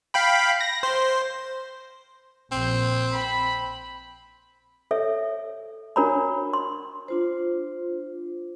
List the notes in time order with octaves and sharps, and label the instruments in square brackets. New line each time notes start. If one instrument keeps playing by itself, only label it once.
[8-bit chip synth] F5 G5 B5
A#6
C5
[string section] A#1 [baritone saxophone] C4
[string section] B5
[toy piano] A4 C#5 E5
D4 F#4 A#4 C#5 A#5 B5
C6
[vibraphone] D4 F4 C5